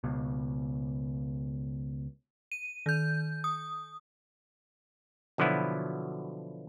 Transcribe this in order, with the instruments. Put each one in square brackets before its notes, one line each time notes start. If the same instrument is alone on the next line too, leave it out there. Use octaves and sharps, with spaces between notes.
[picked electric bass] C#2 B2
[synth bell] D#7
D#3 G6
D#6
[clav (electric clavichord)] B2 D3 F3 F#3 B3 E4